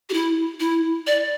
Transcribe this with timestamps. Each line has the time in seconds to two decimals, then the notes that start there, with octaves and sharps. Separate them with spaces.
0.10 G4
0.13 E4
0.60 E4
1.07 D5